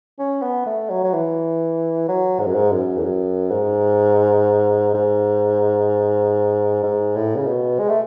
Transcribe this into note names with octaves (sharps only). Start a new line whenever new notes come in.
C#4
B3
A3
F#3
F#3
E3
F#3
G#2
F#2
G#2
F#2
E2
F#2
G#2
G#2
G#2
A2
C#3
B2
G#3
A3